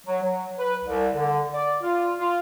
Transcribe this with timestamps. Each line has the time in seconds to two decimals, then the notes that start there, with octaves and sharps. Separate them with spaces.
0.06 F#3
0.23 F#3
0.59 B4
0.85 C2
1.15 D3
1.54 D5
1.82 F4
2.19 F4